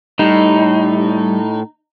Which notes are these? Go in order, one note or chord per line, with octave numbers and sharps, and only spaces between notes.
A2 G3 D#4